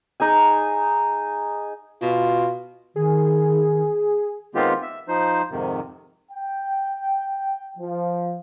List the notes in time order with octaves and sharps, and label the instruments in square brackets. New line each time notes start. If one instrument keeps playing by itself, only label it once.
[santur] D#4 G#4 G#5
[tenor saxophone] B2 [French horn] F4
[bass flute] D#3 [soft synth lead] G#4
[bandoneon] D#3 G#3 B3 C4 F4 G4
E5
F3 D#4 C5
F2 G#2 C3 D#3
[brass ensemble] G5
F3